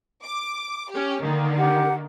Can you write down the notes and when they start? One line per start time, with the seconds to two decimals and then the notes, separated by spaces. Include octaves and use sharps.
0.24 D6
0.91 C#4 G4
1.21 D3 D#3 A#3
1.58 G4 F#5